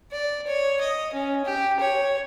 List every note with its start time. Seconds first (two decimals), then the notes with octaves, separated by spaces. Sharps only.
0.12 D5
0.47 C#5
0.81 D#5
1.13 C#4
1.45 G4
1.80 C#5